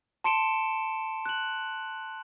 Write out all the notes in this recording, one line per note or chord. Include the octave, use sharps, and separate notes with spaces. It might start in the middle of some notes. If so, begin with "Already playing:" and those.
A5 C6 C#7 D7 E7 G7
F#6 F#7